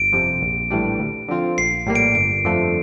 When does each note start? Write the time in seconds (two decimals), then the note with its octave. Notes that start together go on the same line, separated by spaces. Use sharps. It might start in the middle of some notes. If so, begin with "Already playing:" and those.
Already playing: G1 D7
0.12 F2 C3 F3
0.42 A#1
0.70 A2 E3 G3 D4
0.99 D2
1.28 D3 F3 C4 F4
1.58 A#1 C7
1.86 A2 G3 A#3
1.95 D7
2.15 G1 D7
2.44 F2 D3 F3 A3